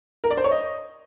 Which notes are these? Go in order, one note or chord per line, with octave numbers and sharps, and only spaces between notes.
A#4
D5
C5
C#5
D#5